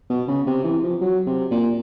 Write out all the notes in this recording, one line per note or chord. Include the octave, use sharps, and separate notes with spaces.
B2
C#3
C3
E3
F3
F#3
C3
A#2